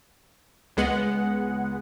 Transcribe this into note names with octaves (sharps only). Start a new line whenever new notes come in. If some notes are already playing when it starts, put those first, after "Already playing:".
C#2 G#3 B3 F#5